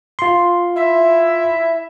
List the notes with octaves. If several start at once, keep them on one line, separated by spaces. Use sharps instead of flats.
F4 C6
E4 E5